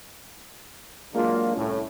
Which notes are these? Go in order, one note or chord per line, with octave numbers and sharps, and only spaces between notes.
F#3 G#3 A#3 D4 F4 G#4
C2 A2 C#4